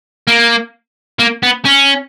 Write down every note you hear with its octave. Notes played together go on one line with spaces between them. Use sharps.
A#3
A#3
B3
C#4